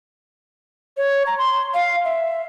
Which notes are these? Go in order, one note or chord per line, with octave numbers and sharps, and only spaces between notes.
C#5
A#5
C6
F5
E5